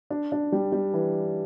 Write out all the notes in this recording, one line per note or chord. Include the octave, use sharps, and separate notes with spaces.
D4
D4
G3
G3
E3